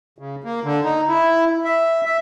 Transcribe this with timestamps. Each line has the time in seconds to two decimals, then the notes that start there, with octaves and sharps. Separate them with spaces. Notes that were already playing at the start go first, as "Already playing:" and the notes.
0.18 C#3
0.44 A#3
0.64 D3
0.83 D#4
1.08 E4
1.64 E5
2.05 E5